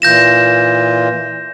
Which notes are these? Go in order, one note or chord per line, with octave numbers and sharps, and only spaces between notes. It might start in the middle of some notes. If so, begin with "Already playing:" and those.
A#2 E3 F4 G6 A#6 E7